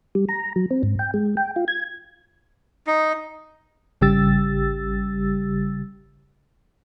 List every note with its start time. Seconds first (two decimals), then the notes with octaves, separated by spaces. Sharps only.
0.15 G3
0.29 A#5
0.56 F#3
0.71 C4
0.83 G#2
0.99 G5
1.14 G#3
1.37 G5
1.56 F4
1.68 G#6
2.87 D#4
4.01 G#1 C#3 G3 G4 E6 A6